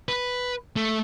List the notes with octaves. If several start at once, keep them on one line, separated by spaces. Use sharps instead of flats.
B4
A3